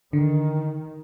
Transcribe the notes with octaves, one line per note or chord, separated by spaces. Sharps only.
D3 D#3